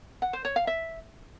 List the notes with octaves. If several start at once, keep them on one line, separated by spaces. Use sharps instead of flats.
F#5
C5
C#5
F5
E5